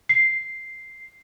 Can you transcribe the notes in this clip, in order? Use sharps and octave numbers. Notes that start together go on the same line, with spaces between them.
C7